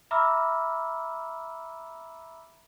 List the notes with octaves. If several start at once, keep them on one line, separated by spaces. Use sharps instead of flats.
E5 A#5 B5 D6 E6 F6